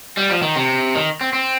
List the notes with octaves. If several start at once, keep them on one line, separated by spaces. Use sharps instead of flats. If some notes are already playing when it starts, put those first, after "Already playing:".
G3
F3
D#3
C3
D#3
C4
C4